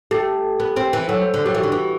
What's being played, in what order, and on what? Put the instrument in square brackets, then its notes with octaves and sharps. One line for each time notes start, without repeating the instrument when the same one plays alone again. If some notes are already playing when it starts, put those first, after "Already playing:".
[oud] A3 [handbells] G4
[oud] B3
C4
E3
[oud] F#3 [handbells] A4
[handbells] C5
[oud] D3 [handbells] A4
[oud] F#3 [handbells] G4
[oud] E3 [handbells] F#4
[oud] D3
E3